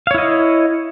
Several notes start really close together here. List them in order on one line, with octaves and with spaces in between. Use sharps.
F5 C#5 E4 D#5